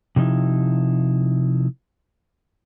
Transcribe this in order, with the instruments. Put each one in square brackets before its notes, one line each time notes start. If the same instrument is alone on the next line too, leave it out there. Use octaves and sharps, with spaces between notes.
[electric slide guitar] C3 F3 D#4 E4